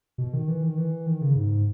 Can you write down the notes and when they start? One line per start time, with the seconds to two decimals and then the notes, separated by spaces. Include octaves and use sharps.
0.18 B2
0.33 D#3
0.48 E3
0.63 D#3
0.77 E3
1.06 D#3
1.22 C#3
1.36 G#2